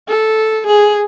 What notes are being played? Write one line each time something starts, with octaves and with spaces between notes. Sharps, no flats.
A4
G#4